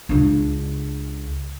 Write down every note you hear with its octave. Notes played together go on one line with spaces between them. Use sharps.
C#2 D4